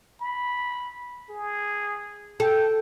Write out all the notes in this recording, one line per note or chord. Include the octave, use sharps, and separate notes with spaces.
B5
G#4
A4 G5